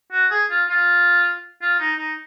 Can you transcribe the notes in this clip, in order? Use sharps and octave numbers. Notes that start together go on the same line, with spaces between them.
F#4
G#4
F4
F4
F4
D#4
D#4